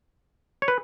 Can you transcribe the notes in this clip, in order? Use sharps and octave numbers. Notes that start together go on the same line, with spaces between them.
C#5
B4